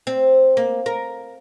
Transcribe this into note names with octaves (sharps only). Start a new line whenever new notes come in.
C4
A#3
A#4